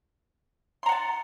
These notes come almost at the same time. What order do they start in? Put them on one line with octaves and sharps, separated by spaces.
C6 A#5 F#5 A5